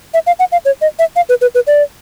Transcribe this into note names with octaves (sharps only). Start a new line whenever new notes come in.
E5
F5
F#5
F5
C#5
D#5
E5
F5
B4
B4
B4
D5